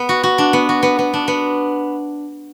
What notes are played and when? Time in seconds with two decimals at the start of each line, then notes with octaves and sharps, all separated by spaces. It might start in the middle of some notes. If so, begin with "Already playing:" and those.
Already playing: B3
0.09 F#4
0.23 F#4
0.38 D4
0.53 B3
0.69 F#4
0.83 B3
0.99 B3
1.14 D4
1.28 B3